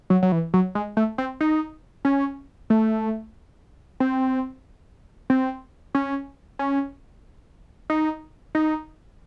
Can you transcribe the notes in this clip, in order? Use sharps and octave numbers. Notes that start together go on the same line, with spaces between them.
F#3
F#3
E3
F#3
G#3
A3
C4
D#4
C#4
A3
C4
C4
C#4
C#4
D#4
D#4